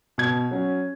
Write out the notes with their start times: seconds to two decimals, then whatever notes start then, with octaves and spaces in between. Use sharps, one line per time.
0.18 B2 G#6
0.51 F#3 C#4